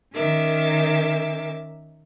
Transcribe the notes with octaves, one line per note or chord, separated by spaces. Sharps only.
D#3 C#4 A#4 E5 D6